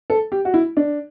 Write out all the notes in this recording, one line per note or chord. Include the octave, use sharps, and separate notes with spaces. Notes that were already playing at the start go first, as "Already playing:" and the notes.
A4
G4
F#4
E4
D4